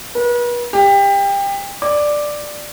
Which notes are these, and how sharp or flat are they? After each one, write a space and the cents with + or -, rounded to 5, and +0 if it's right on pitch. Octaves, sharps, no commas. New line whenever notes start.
B4 -40
G4 +25
D5 +5